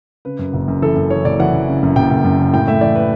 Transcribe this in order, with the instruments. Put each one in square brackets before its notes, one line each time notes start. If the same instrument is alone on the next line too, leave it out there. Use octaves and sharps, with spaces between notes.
[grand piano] C#3 B4
F#2
F#1
F#2
E3 A4
F#2
E3 C#5
F#1 D5
E3 F#5
F#1
C#3
F#2
F#1 G5
F#1
F#2
C#3
A2 G5
A3 E5
E3 D5
B4